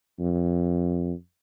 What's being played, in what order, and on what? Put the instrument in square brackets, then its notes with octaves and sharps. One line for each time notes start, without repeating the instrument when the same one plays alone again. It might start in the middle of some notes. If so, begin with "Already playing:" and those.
[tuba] F2